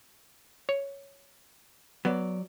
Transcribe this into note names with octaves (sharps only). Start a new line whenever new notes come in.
C#5
F#3 B3 D5